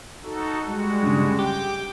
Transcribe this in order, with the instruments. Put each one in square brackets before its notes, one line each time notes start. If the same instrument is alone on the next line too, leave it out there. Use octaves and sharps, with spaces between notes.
[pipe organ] D#4 F#4 A4
G3 G#3 F#4
[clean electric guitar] G2 C#3
[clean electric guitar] G4 [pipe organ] G5 D6